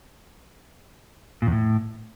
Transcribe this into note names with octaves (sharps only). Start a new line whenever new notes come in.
A#2
E2
A2